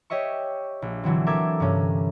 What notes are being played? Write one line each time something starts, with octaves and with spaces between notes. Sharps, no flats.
G4 C#5 D#5 E5 C#6
A#1
D3 E3 F#3 C4
A4 A#4 E5 D6 G#6
G2 C3 C#4